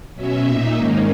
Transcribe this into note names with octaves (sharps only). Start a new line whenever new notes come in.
B2 F#3 C#4 E5
A#2 A#3 D#4
G#2 D#3 A#3 C#4